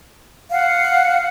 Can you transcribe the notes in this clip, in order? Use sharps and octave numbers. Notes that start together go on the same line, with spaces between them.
F5 F#5